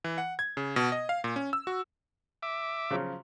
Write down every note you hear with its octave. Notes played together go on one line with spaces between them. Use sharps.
E3
F#5
G#6
C#3
B2
D#5
F5
A#2
C#4
E6
F#4
E5 D6
C#3 F3 F#3